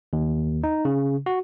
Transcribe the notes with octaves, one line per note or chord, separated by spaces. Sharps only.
D#2
D#4
C#3
F#4